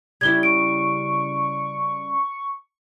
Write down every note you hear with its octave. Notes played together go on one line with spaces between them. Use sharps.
C#3 G3 E4 G#6 G7
C#6 D7